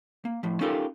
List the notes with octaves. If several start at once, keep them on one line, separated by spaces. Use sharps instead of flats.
A#3
A2 F3
C#4 D#4 F4 G4 A4 A#4